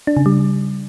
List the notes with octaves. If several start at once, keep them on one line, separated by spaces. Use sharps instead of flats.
D4
C#3
G3